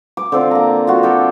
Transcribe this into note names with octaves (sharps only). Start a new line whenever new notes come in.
D6
D3 C4 F4
A#3 A#5
F4 F#4
G4 A4 G5